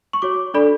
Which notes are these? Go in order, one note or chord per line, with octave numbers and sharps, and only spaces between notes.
C#6
F#4 C#5 D6
D4 A4 D5 B5